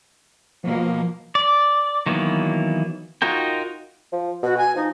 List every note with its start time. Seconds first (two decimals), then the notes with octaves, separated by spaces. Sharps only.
0.64 B2 F3 A#3
1.35 D5
2.06 D#3 E3 F#3 A#3 B3
3.22 D#4 F4 F#4 A#4 G5
4.12 F3
4.43 B2 F#4
4.57 G#5
4.76 F3 D#4